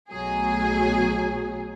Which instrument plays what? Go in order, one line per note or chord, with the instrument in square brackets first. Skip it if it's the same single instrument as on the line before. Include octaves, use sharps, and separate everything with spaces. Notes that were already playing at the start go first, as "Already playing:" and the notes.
[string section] B1 B2 F#3 A3 G#4